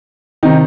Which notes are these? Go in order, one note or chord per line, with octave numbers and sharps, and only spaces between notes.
C3 D#3 D#4